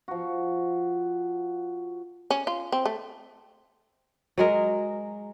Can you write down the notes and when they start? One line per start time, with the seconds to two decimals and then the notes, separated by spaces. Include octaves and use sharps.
0.08 F3 F#4
2.31 C#4
2.47 F4
2.72 C4
2.86 A3
4.38 F#3 G#3 A#4